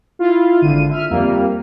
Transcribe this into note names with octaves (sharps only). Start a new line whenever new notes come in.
E4 F4
G#1 D3 D#7
E5 F6
F2 G3 A#3